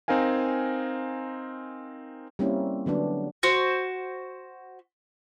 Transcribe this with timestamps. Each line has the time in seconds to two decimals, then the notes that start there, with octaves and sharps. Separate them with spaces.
0.08 C4 D#4 A#4 F5 G#5
2.39 G3 A#3 C4 C#4 E4
2.86 D3 F#3 B3 D4
3.43 F#4 C5